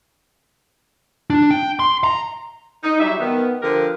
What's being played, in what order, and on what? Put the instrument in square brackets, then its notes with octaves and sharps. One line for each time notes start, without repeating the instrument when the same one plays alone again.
[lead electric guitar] D4
G5
C6
A#5
[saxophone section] D#4
F#3 G3 E5
D#3 B3
D3 F3 G4 A#4 B4